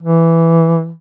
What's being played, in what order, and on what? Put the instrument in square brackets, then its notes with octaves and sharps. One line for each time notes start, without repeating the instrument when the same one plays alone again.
[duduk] E3